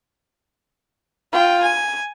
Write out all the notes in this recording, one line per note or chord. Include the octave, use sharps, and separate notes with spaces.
F4 G5
G#5